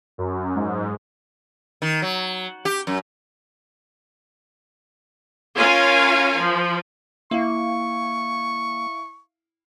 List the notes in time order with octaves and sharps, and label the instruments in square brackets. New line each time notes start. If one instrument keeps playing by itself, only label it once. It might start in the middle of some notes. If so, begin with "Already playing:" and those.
[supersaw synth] F#2
G#2
[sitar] D#3
F#3
G4
F#2
[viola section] C#4 F4 A#4 F5 G#5
F3
[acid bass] A#3 [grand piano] E4 F5 [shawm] C#6